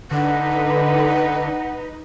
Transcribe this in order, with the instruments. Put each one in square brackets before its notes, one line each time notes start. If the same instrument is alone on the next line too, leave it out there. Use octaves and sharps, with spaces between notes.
[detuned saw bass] D3 [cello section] D#4 B4 [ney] F#5